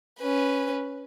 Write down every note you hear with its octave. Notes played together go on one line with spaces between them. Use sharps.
C#4 B4